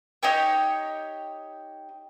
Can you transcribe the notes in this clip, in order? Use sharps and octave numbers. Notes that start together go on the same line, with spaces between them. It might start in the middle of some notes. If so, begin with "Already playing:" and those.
D#4 G4 C#5 G5